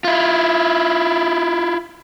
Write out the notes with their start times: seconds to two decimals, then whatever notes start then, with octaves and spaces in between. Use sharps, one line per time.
0.04 E4 F4